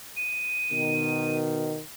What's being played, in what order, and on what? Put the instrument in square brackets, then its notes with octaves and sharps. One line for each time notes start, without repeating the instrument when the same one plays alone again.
[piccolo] D#7
[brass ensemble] B2 D#3